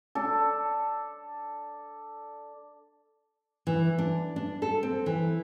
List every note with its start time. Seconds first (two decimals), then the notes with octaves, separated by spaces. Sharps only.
0.15 D4 A4
3.67 E3
3.98 D4
4.36 D4
4.62 A4
4.83 C4
5.06 E3